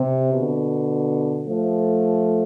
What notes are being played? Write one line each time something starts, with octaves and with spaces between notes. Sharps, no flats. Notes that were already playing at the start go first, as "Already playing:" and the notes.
Already playing: C3
B2 D3
F3 A3